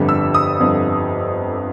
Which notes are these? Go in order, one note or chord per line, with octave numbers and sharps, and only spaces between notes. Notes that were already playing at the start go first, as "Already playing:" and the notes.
Already playing: G1 F2 D3 G3
E6
D#6
G1 F2 D3 G3